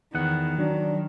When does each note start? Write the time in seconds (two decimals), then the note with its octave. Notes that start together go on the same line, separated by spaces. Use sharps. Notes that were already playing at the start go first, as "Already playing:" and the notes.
0.15 E2 D#3 B3 F#5
0.59 F#3 D4